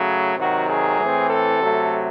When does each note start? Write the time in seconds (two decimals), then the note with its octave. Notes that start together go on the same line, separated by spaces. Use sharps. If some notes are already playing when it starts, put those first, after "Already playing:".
Already playing: C#3 F#3 A3
0.37 C3 D#3 F#3 F#4
0.68 G#4
0.99 A2 E3 C4
1.30 A4
1.60 C3 F#3 A3